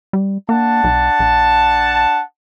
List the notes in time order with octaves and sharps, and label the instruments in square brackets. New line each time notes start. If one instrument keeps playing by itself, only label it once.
[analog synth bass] G3
[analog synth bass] A#3 [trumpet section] D4 F#5 A5
[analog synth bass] B1
A#1